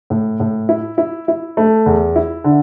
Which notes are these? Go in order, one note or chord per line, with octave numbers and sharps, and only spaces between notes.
A2
A2
E4
E4
E4
A3
E2
E4
D3